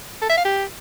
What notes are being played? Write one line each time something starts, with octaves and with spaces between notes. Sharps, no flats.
A4
E5
F5
G4